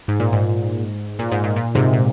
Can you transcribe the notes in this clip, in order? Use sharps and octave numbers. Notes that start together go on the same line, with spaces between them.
G#2
A#2
G#2
A#2
G#2
A#2
A#2
G#2 C3
A#2